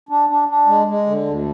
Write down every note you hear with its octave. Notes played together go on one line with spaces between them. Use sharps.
D4
D4
D4
G#3
G#3
D3
D2